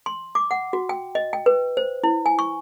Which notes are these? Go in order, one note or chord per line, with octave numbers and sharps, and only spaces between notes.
C6
D6
F#5
F#4
G5
D#5
G5
B4
C5
E4
G#5
C#6